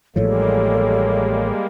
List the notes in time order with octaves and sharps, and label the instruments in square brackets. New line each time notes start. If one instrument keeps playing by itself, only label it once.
[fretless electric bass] A1 A2 F3 [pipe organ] G3 G#3 A#3 [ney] A4 [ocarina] C#5